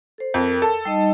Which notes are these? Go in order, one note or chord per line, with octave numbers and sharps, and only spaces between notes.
A4 C5
F2 A#4
A4
G3 D#4 D#5